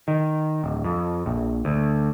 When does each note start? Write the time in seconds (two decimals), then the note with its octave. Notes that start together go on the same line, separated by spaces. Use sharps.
0.08 D#3
0.64 D1
0.84 F2
1.26 A#1
1.65 D2